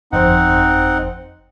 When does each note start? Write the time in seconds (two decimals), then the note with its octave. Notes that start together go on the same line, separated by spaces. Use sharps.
0.12 G1 F2 C4 D#4 C5 F#5